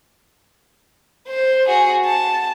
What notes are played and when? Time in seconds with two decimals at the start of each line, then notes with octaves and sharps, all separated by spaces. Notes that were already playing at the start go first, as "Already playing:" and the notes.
1.28 C5
1.67 F#4 G#4
2.05 A5